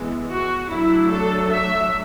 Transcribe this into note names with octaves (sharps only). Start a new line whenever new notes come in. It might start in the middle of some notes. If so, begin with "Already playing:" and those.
Already playing: E3 G#3 B3
F#4
F#3 A3 D4 E4
A4
E5